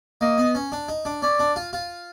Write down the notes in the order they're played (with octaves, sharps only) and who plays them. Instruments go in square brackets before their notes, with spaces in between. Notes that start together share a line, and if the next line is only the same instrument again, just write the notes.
[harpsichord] A#3 [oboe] D#5
[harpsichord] B3
C#4
D4
D#4
D4
[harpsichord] C#4 [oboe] D5
[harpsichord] D4
F4
F4